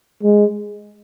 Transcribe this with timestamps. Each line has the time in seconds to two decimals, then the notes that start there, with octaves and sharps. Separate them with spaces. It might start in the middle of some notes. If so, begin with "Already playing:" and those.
0.23 G#3